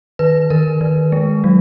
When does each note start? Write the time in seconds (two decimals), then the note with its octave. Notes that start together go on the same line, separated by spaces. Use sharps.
0.19 D#3 B4
0.50 D#3 A#4
0.81 D#3
1.12 G#3
1.44 F#3